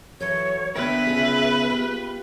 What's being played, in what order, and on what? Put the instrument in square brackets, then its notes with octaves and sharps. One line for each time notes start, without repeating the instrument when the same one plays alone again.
[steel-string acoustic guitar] E3 F#3 A4 [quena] C#5
[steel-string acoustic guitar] D3 F4 G5 [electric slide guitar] B3 A#4 [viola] B4 [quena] E5
[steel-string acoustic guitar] C#3 F4 G#4
F4 G4